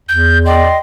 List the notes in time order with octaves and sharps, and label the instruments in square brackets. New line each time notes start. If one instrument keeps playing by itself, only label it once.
[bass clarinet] E2 [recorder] G6
[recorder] D5 [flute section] D#5 G5 C6